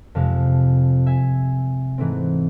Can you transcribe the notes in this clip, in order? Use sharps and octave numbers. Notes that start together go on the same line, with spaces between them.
F2 C3 G#3 F5 A5
E5 G#5
G#2 E3 A3 C4